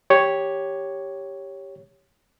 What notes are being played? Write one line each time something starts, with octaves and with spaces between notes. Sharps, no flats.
G4 C#5